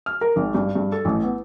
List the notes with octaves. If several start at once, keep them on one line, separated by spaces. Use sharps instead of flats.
F6
A#4
G#1
G2
G2
A4
A1
B3